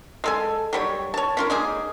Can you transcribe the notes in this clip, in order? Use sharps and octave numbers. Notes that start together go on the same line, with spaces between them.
G#3 A4 G#5
F#3 G3 C#5
C#5 A5
C#4 F4 A#4
G#3 A#3 D#4 G#4